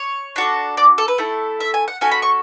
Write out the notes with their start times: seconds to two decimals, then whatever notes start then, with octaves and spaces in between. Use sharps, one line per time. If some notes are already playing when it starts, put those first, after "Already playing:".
Already playing: C#5
0.36 D4 F#4 A4
0.77 D5
0.98 A4
1.08 B4
1.18 A3 E4 A4
1.60 E5
1.74 G#5
1.88 F#5
2.01 C#4 F#4 A4 G#5
2.12 B5
2.22 C#6